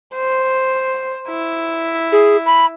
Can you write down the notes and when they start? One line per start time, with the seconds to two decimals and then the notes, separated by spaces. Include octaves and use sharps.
0.15 C5
1.28 E4
2.12 G#4
2.46 B5